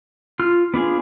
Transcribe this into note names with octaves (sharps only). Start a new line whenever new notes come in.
F4 F6
B3 D4 F4 G#4